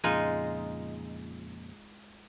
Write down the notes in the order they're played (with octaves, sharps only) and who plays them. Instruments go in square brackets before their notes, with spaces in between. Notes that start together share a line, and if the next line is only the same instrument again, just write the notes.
[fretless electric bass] F2 A#2 C#3 [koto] G#3 D#4 F4